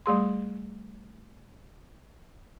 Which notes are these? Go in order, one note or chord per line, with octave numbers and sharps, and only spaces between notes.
G3 A3 G#4 C6